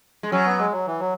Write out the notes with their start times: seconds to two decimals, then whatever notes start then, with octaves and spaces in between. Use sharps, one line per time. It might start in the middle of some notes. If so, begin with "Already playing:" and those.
0.23 G#3
0.32 F#3 C#4
0.46 B3
0.59 G#3
0.72 F#3
0.86 E3
1.00 F#3